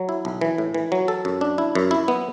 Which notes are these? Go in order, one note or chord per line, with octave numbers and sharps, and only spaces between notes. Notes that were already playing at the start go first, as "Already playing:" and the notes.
Already playing: F#3
E4
B1
E3
A2
E3
F#3
A4
F#2
D4
E4
F#2
E4
B3